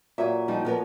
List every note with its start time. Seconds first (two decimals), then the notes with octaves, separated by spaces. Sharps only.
0.18 A#2 F#3 E5 G#5
0.48 F3 G3 D#4
0.65 F3 B3 A#4